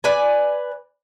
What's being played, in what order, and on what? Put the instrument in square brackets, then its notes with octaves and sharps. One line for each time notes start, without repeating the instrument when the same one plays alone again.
[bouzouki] B4 D5 G#5